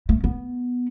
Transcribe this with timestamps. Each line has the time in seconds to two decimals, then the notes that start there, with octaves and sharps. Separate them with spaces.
0.09 A3
0.24 B3